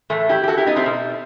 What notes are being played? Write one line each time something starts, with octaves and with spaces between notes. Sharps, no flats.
A2 E3 A3
E4 G4
G4
F#4 A4
E4 G4
B3 D#4
A3 C4
B2